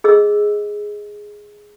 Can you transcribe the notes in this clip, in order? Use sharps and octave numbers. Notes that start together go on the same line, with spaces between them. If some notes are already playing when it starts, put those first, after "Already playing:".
G#4 D#5 E6